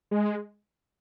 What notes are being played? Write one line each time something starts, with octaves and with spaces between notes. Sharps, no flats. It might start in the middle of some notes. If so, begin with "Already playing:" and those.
G#3